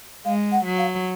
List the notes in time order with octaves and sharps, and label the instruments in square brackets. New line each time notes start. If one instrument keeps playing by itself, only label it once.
[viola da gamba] G#3 [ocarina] F5
[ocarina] F#5
[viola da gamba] F#3
[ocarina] F5